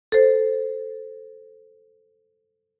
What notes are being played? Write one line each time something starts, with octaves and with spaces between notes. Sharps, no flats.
A4 C5